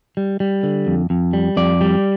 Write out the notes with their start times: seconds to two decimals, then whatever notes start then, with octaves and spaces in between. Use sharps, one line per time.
0.17 G3
0.40 G3
0.63 D3
0.87 F2
1.10 F2
1.33 G3
1.57 F2 D5
1.81 G3